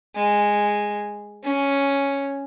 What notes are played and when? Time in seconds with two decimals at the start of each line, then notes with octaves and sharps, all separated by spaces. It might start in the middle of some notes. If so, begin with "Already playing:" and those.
0.15 G#3
1.43 C#4